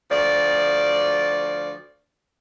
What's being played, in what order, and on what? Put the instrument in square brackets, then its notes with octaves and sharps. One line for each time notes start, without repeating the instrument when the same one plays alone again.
[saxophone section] D2 F3 D5